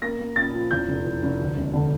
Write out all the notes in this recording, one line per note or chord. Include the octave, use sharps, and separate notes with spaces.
A#3 A#6
A#3
A#2 A6
F3
E2 G6
F1
E3
F1
D2
E1
D3